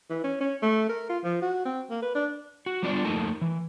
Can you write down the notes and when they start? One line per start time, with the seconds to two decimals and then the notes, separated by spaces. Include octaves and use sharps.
0.10 E3
0.24 C#4
0.41 C#4
0.62 A3
0.89 A#4
1.09 F4
1.24 F3
1.42 F#4
1.65 C4
1.90 A#3
2.02 B4
2.15 D4
2.66 F#4
2.83 G3 B3 D4 F4 F#4 D5
3.05 F2 A3 A#3 D#4 A#4 A5
3.41 E3